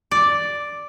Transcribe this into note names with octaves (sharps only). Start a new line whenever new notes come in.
D5